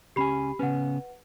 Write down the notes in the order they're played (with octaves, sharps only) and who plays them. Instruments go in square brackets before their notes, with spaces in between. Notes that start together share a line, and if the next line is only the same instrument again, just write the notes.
[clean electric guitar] C#2 C#4 G#5 [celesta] G4 B5 C7
[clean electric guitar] C#3 B3 C#4 [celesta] B4 F#5